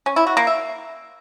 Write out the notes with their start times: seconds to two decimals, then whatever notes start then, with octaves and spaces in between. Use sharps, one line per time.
0.06 C#4
0.16 E4
0.27 F#4
0.37 A#3
0.47 E5